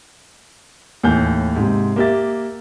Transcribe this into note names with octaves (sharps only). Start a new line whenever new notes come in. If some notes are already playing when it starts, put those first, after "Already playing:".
D#2 A2 E3 G#5 G6
G#2 C3
A#3 G4 E5 A6